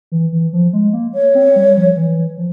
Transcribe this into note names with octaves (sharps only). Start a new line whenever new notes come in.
E3
E3
F3
G#3
A#3
C#5
C4
G3
F3
E3
F3